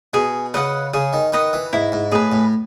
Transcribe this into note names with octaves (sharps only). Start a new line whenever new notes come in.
B2 G#4
C#3 B4 D#5 F#5
C#3 G#4
D#3
D#3 B4 D#5 F#5
E3
G#2 E4
G#2
A2 G#4 B4
A2